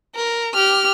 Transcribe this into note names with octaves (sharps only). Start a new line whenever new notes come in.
A#4
G4 F6